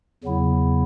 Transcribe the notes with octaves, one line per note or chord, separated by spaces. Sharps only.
E2 C#3 F#3 B3 E4